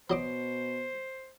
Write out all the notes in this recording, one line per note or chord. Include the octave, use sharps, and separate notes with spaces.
B2 F#3 C5 D#5 D6